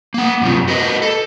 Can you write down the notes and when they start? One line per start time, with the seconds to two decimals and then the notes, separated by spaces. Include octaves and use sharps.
0.14 A#3 F#5
0.42 F#2 C3 F4
0.68 F#4 A#4 B4 C#5 D#5
1.02 A4